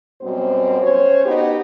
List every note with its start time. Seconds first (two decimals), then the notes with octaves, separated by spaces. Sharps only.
0.21 F#2 B2 G3 C4 C5
0.81 C#4 C5 C#5
1.25 B3 D#4 F#4 G4